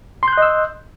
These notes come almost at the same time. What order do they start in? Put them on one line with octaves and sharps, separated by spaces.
C6 G6 F#6 D#5 E6